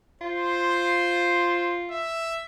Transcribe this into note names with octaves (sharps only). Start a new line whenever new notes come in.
F4 C5
E5